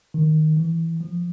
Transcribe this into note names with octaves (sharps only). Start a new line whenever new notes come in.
D#3
E3
F3